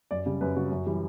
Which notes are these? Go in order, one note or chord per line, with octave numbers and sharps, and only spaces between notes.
F#2 D5
C#3 G3
F#2 B4
C#3 G3 F#4
F#2
E3 G3